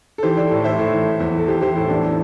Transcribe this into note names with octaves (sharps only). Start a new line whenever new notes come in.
A4
E3 G4 C5
E3 A4 D5
A2
E3 C5 E5
A2
E3
E3
E2
E3
A4
E3 G4 C5
E3 G4 C5
A2 E4 A4
E2 D4
E3